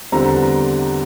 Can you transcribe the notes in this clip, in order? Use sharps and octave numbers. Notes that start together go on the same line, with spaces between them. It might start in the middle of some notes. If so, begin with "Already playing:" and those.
E2 D3 G3 C4 A#5
A#5